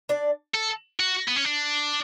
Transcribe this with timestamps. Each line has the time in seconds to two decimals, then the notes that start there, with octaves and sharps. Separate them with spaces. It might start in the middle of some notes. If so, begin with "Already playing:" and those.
0.09 D4 D5
0.54 A4
1.00 F#4
1.28 B3
1.36 C#4
1.45 D4